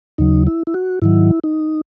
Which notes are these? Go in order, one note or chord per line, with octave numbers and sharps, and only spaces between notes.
D#2 C#3 F#3 D#4
E4
E4
F#4
G#2 D#3 F#3 E4
D#4